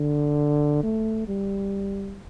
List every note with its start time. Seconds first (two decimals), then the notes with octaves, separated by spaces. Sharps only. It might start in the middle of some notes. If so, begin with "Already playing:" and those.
Already playing: D3
0.83 A3
1.28 G3